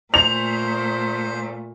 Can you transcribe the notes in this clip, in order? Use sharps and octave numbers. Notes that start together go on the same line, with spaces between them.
A#2 A3 C5 F7